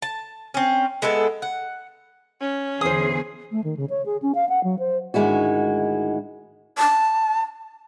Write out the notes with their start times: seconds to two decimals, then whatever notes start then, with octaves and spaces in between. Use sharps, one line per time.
0.02 A5
0.54 C4 C#4
1.02 G#3 B3 E4 A4
1.42 F#5
2.41 C#4
2.81 E2 D3 E3 G#4 C5 D#6
3.52 A3
3.64 D#3
3.77 C#3
3.90 C#5
4.06 G#4
4.22 C#4
4.35 F5
4.49 F#5
4.64 F#3
4.79 C5
5.14 D2 G#2 D#3 G#3 E4 F#4
6.78 A5